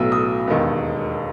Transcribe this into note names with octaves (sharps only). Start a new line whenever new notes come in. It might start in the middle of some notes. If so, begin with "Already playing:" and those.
Already playing: B1 A2 F#3 B3 E6
D#6
E1 D#2 D#3 G#3 B3